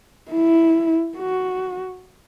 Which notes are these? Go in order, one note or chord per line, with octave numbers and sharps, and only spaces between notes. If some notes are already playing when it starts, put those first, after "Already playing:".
E4
F#4